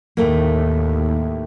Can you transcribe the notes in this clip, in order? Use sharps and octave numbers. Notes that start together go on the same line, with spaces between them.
D#2 A2 A3 A#3